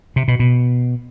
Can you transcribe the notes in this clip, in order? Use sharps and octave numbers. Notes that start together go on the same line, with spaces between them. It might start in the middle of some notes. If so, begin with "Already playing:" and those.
C3
B2
B2